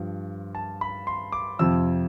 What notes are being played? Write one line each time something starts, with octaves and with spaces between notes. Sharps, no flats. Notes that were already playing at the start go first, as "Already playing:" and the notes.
Already playing: G2 F3
A5
B5
C6
D6
F2 C3 F3 E6